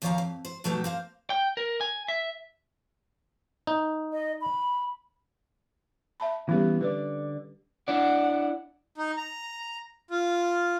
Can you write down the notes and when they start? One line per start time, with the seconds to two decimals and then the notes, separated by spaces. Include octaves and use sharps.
0.02 D#2 F3 C#5 D5 F5 A#5
0.18 F2
0.45 C5
0.64 B2 F#3 A3 D#4 G4
0.84 A#3 C5 F5
1.30 G5
1.57 A#4
1.81 G#5
2.08 E5
3.67 D#4
4.13 D#5
4.41 B5
6.20 E5 A5 B5
6.49 E3 G3 B3 C#4 G4
6.81 D3 B4 D5
7.88 D4 E4 D5 F#5
8.98 D#4
9.17 A#5
10.11 F4